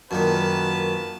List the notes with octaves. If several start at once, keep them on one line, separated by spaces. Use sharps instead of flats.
F#2 A#2 D#3 F#4 B4 A5